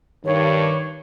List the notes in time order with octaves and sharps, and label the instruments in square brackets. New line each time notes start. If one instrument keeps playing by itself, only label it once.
[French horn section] G2 [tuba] D#3 [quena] C#5